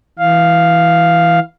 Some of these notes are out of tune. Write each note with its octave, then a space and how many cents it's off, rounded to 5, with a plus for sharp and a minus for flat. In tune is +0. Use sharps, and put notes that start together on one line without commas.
E3 +0 F5 +0